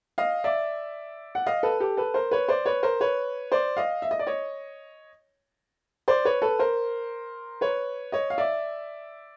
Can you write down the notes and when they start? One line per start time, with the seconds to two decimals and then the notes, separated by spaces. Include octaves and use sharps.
0.18 D#5 F5
0.44 D5 E5
1.35 F#5
1.47 D#5 F5
1.63 A4 B4
1.80 G4 A4
1.97 A4 B4
2.14 A#4 C5
2.31 B4 C#5
2.49 C5 D5
2.66 B4 C#5
2.83 A#4 C5
3.01 B4 C#5
3.52 C5 D5
3.77 D#5 F5
4.02 E5
4.11 D#5
4.19 D5
4.27 C#5 D#5
6.08 C5 D5
6.25 B4 C#5
6.42 A4 B4
6.59 A#4 C5
7.61 B4 C#5
8.12 C#5 D#5
8.30 F5
8.38 D5 E5